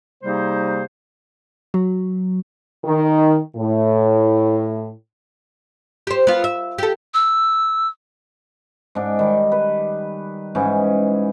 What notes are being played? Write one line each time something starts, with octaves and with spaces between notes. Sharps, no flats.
C3 G3 A#3 D#4 G#4 C5
F#3
D#3
A2
G4 C5
B3 F4
E5
G4 A4
E6
G#2 D4
D#3 G3
B4
G#2 E3 C#4